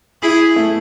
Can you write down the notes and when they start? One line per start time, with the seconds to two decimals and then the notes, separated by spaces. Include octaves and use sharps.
0.23 E4 G#4
0.56 A3